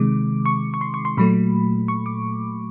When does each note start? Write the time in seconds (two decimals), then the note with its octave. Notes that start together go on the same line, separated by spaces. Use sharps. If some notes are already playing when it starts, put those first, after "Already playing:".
Already playing: C3 D#3 G#3 D6
0.46 C#6
0.74 C#6
0.81 C6
0.94 C#6
1.05 C6
1.17 A#2 F#3 A3 B5
1.88 C#6
2.06 D6